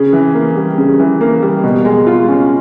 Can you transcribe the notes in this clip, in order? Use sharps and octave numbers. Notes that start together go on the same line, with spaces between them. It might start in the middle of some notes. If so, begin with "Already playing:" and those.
Already playing: C#3
E3
A#3
G3
C#3
E3
A#3
G3
B2
G#3
F4
C#4